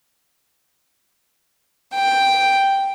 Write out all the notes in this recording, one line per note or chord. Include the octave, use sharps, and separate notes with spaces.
G5